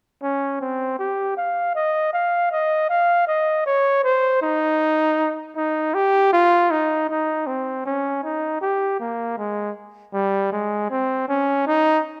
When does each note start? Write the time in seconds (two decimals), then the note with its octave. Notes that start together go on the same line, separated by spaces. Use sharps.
0.22 C#4
0.61 C4
0.99 G4
1.37 F5
1.75 D#5
2.13 F5
2.51 D#5
2.89 F5
3.27 D#5
3.66 C#5
4.04 C5
4.42 D#4
5.57 D#4
5.94 G4
6.33 F4
6.71 D#4
7.09 D#4
7.47 C4
7.85 C#4
8.24 D#4
8.61 G4
9.00 A#3
9.38 G#3
10.13 G3
10.52 G#3
10.90 C4
11.28 C#4
11.67 D#4